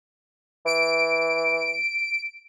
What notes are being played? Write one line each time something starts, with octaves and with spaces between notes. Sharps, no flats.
E3 D7